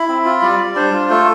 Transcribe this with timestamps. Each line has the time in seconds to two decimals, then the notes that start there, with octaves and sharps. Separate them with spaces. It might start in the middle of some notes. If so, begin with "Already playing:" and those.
Already playing: E4 B5
0.08 C4
0.25 F4
0.42 G3 D5
0.59 G3
0.75 D4 C5
0.93 F4
1.10 A3 A4